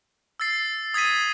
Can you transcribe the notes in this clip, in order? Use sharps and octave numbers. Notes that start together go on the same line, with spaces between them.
E6 A6 C7
D#6 G#6 B6 D#7